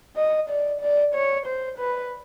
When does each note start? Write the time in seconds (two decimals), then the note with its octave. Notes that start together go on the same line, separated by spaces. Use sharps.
0.17 D#5
0.49 D5
0.81 D5
1.14 C#5
1.46 C5
1.78 B4